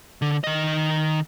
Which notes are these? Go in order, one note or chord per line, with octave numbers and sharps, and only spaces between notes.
D3
D#3 D#5